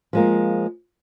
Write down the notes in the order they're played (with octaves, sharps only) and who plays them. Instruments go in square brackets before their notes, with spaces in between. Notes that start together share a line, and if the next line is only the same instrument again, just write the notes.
[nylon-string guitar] F3 G#3 A#3